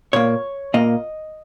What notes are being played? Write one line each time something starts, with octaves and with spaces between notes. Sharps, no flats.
A#2 A#3 C#5
A#2 A#3 D#5